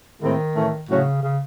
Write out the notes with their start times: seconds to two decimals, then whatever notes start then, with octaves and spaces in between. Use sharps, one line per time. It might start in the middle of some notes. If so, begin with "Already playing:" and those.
0.22 A2 D#3 G#3 C4 E4
0.55 A2 E3 A3 C#4
0.89 A2 C#3 F#3 C#4 F#4
1.23 C#3